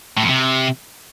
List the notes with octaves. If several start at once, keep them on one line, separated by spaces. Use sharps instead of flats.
A2
F2
C3